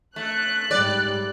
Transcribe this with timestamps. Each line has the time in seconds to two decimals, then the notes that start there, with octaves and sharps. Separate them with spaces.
0.16 A3 F#6
0.71 G#2 G3 D5